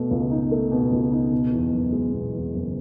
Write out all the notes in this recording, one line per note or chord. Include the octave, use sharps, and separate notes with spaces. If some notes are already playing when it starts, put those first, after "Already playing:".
Already playing: B2 A3
C#2
D#4
A3
B2
C#2
D#4
B2
E2
F#1
G#3
B2
E2
F#1